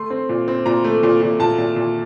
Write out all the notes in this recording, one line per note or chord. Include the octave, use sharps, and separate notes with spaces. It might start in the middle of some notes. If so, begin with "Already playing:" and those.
Already playing: A3 C6
C4
A#2
C4
A#2 A#5
A3
A#2
A#2
A#2 A5
A#2
A#2